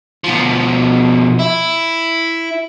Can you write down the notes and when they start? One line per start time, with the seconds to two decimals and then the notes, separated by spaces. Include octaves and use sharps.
0.24 B2 F3
1.40 E4